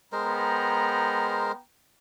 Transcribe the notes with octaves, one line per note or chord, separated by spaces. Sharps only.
G#3 B3 A#4 C5 G5 A#5